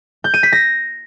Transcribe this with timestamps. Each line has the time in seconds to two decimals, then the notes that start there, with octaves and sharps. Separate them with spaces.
0.24 G6
0.34 D#7
0.43 B6
0.52 A#6